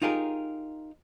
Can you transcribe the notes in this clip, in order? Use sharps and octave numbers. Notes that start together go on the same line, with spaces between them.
D#4 F4 G4 G#4 A#4